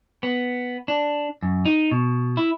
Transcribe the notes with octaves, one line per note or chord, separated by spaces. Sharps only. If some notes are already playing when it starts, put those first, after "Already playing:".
B3
D4
F#2
D#4
B2
E4